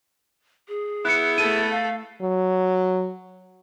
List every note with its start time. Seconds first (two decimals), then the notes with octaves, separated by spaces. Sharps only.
0.69 G#4
1.05 B3 E4 F#6 C#7
1.38 A3 A4 D#7
1.70 F5
2.22 F#3